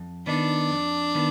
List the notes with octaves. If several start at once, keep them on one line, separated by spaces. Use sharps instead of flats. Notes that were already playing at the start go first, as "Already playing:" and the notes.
Already playing: F2
D#3 B3 D4 D#4
F2
D#3 B3